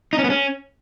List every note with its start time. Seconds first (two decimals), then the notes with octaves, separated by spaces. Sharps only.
0.13 D#4
0.19 C#4
0.24 B3
0.30 C#4